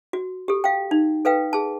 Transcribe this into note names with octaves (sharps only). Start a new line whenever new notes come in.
F#4
G4 A4
F5 G5
D#4
A4 B4 F5 G5
G#4 A5